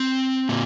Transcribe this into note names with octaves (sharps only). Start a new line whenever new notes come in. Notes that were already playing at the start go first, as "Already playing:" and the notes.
Already playing: C4
A#2